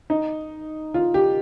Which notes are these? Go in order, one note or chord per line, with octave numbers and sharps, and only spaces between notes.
D#4
F4
G4